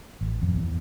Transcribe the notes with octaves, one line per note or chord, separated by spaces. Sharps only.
A1
F2
E2